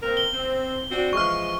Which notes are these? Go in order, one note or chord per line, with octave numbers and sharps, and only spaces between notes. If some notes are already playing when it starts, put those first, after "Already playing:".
A#3 C4 A#4
G7
C4
C4 D4 F#4
E3 F3 G#3 C#6 F6